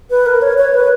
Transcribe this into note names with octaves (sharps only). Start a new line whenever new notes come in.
B4
A#4
C#5
C#5
B4